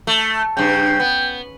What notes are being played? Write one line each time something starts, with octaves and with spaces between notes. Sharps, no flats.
A3
G2 C#3 G5
B3